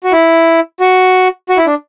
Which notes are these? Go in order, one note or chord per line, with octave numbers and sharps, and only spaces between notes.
F#4
E4
F#4
F#4
E4
D4